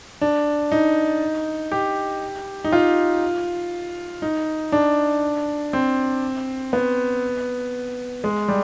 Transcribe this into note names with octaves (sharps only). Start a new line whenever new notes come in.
D4
D#4
G4
D#4
F4
D#4
D4
C4
B3
G#3
G3